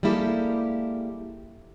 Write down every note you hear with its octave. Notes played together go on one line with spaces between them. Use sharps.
G3 G#3 A#3 E4 G4 A4